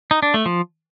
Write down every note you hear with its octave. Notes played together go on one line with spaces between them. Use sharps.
D#4
D4
A3
F3